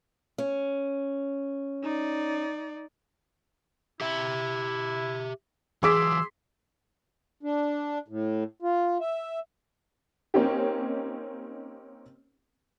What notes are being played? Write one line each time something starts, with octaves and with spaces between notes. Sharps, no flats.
C#4
D#4 D5
E4 G4 E5
E3 F#3 G#4 C6 D6 E6 B6
D4
A2
F4
E5
A#3 C4 C#4 D#4 G4